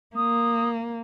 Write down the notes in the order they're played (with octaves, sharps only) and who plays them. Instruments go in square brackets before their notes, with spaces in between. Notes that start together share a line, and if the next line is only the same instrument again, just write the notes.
[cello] A#3 [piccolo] D#6